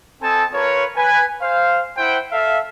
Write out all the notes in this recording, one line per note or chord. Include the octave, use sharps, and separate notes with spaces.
C4 A4 D#5 G#5 A5
F4 A#4 B4 C#5
B4 G#5
C5 F5
E4 C5 F#5 G5
A4 E5 F5